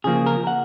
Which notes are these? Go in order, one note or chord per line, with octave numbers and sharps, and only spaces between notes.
C#3 F3 A#3 G#4
A#4
F#5